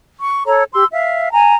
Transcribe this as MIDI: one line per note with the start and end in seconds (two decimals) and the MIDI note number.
0.22 0.44 85
0.46 0.63 69
0.46 0.63 73
0.46 0.63 82
0.73 0.84 67
0.73 0.84 84
0.73 0.84 88
0.92 1.29 76
0.92 1.29 77
1.32 1.55 80
1.32 1.55 82